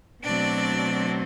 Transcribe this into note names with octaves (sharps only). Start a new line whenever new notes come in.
B2 F#3 A3 C4 D4 D5